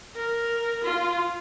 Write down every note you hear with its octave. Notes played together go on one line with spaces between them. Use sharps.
A#4
F4